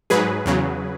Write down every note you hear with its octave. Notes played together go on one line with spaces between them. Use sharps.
G#2 F#3 G#4 B4
E2 C#3 F#3